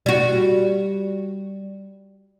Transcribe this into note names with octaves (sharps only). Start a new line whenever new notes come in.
G3 F#4